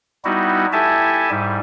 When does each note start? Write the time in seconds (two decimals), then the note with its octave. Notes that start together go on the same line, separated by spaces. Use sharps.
0.25 G3 B3 D#4 E4 F#4
0.73 E4 G4 A4 E5 G#5 A5
1.30 G#2 G3